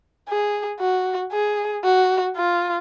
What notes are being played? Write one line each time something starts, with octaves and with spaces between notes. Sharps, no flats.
G#4
F#4
G#4
F#4
F4